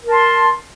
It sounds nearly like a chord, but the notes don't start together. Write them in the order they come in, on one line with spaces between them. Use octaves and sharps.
A#4 A5 C6